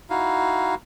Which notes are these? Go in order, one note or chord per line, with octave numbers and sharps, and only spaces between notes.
D#4 E4 F#4 F5